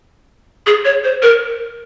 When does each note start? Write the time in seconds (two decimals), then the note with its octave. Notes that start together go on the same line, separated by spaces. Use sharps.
0.66 G#4
0.85 C#5
1.04 C5
1.22 A#4